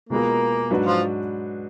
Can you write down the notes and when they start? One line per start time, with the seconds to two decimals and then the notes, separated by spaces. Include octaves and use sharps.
0.09 B2 G#3 A#3 B3 F4 G#4 A#4
0.70 G#2 F#3 D4 F#4 B4
0.85 F3 F4